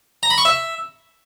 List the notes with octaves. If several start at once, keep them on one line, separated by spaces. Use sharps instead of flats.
A#5
B5
C#6
E5